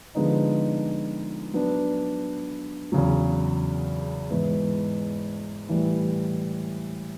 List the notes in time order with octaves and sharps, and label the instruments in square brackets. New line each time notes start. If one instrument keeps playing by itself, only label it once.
[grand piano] D3 F3 G#3 B3 D#4
F#3 B3 D4
E2 C#3 F#3
G#2 E3 G#3 B3 E4
A2 E3 G3